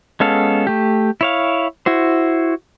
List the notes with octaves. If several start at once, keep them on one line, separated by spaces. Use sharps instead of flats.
G#3 B3 C#4 A4 F5
A3 G4
E4 C#5 F5
E4 F#4 C5